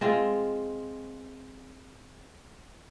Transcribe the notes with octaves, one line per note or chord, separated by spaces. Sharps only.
G#3 C4 F4